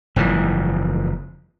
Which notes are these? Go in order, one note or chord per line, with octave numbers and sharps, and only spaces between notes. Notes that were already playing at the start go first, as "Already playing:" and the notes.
F#1 G#2 E3 F3